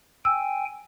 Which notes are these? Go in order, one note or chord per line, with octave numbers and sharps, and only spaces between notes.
G5 G#5 E6